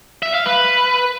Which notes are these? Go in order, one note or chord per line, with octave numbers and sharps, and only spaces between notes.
E5
F5
B4